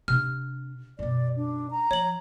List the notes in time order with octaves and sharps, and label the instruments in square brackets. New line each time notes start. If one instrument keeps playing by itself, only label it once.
[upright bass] C3 D4 [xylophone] F6
[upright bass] F#2 B2 [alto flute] D5
[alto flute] D4
A#5
[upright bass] F3 [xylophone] C#5 F#7